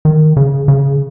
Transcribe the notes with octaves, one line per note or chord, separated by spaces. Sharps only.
D#3
C#3
C#3